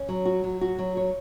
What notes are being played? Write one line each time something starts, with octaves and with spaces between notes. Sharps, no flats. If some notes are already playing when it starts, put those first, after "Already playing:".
Already playing: C#4
F#3
F#4
F#3
F#4
F#3
C#5